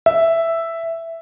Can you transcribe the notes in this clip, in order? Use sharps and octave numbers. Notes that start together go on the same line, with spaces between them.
E5